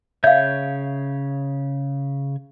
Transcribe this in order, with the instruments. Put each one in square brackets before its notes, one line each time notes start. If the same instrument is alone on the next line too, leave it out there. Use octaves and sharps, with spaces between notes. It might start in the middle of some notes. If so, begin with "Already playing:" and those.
[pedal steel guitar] C#3 C#5 G6 [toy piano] E5 F5